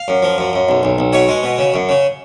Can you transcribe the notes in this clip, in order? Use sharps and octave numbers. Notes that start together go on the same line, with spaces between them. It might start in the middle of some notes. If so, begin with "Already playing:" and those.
Already playing: F5
F#2
F3
F#2
F#2
B1
B1
B1
B2 C#5
G#3
B2
C#3
F#2
C#3